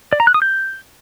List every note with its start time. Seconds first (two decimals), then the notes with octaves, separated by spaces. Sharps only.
0.13 D5
0.20 A#5
0.27 F#6
0.34 D#6
0.42 G6